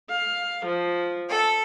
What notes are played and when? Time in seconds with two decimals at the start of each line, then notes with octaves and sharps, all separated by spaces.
0.10 F5
0.64 F3
1.31 A4